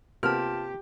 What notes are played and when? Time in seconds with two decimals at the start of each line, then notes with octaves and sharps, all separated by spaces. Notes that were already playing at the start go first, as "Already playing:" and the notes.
0.23 C3 A#3 B3 F4 G4 A5 F6